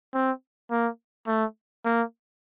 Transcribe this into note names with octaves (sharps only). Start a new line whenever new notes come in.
C4
A#3
A3
A#3